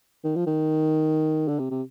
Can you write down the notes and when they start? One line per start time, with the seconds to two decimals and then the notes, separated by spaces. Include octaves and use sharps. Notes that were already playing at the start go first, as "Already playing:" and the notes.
0.24 D#3
0.36 F3
0.47 D#3
1.48 D3
1.59 C3
1.71 C3